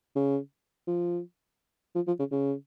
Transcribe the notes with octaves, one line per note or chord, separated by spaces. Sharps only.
C#3
F3
F3
F3
C#3
C#3